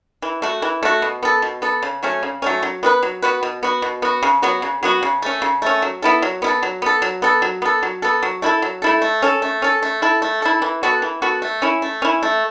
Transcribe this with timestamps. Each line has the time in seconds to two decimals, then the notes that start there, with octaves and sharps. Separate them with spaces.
0.22 E3
0.42 A3 F#4
0.62 E3
0.83 A3 F#4
1.02 B2
1.23 B3 A4
1.42 B2
1.62 B3 A4
1.83 C#3
2.03 F#3 A3 C#4
2.23 C#3
2.42 F#3 A3 C#4
2.63 F#3
2.83 B3 F#4 B4
3.03 F#3
3.22 B3 F#4 B4
3.43 B2
3.63 B3 F#4
3.82 B2
4.02 B3 F#4
4.23 C#3
4.42 F#3 B3 F#4
4.62 C#3
4.83 F#3 B3 F#4
5.03 C#3
5.22 A3 C#4
5.42 C#3
5.62 A3 C#4
5.82 F#3
6.02 B3 E4 A4
6.22 F#3
6.42 B3 E4 A4
6.63 F#3
6.82 B3 A4
7.02 F#3
7.22 B3 A4
7.42 F#3
7.62 B3 A4
7.83 F#3
8.02 B3 A4
8.23 F#3
8.42 A3 E4 A4
8.62 F#3
8.82 A3 E4 A4
9.02 A3
9.22 C#4 A4
9.42 A3
9.62 C#4 A4
9.83 A3
10.02 E4 A4
10.22 A3
10.42 E4 A4
10.62 E3
10.83 B3 F#4 A4
11.02 E3
11.22 B3 F#4 A4
11.42 A3
11.62 C#4 E4
11.82 A3
12.02 C#4 E4
12.23 A3